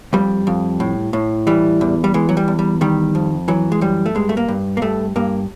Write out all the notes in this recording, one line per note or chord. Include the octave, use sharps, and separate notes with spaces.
F2 G3
F2
A2
A2
E3 G3
E2
G3
E3 G#3
F#3
G3
E2
G3
D#3 G3
F2
E3 F#3
G#3
F#2 G3
A3
G2 G#3
A3
A#3
G2
A#3
G2 A3
G2 A#3